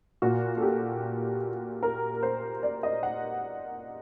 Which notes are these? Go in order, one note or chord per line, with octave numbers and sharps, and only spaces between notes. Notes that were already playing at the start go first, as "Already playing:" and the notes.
A#2 F#4
A4
G4
A#4
C5
D5
D#5
F#5